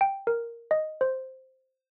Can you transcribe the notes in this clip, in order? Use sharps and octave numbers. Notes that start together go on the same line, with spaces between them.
G5
A#4
D#5
C5